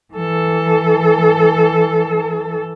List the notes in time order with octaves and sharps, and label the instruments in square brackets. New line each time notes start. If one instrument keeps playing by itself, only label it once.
[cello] E3 A4